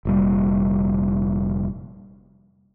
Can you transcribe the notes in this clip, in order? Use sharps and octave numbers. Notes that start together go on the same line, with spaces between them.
F1 A#2 G3